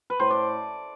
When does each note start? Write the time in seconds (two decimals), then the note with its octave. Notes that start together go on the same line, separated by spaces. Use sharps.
0.10 B4
0.20 A2 C5
0.31 D5